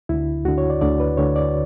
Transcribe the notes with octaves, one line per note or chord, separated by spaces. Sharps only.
D2 D3 E4
D2 D3 F#4
C#5
D5
D2 D3 D5
B4
D2 D3 C#5
D5